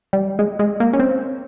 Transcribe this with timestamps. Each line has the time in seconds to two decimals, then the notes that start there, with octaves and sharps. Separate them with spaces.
0.13 G3
0.39 G#3
0.59 G#3
0.80 A#3
0.93 C#4
1.00 C4